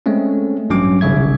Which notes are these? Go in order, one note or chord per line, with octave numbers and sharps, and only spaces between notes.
G#3 A3 C4 C#4
A1 G2 F#3 C#4 D6
G1 C2 C#3 E5 G#6